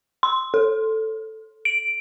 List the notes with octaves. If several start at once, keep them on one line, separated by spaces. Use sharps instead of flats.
C6
A4
D7